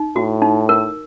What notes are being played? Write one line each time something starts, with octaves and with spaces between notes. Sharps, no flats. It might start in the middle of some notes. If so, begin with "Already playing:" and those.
Already playing: D#4
A2 F#4
D#4
A#4